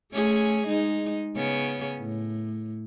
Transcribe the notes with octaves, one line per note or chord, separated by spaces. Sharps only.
A3 C#4 G#4
G#3 D#4
C#3 B3 C#4
A2